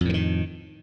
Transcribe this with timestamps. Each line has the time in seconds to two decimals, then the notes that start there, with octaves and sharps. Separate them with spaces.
0.01 F2
0.05 A2
0.09 D3
0.14 D#3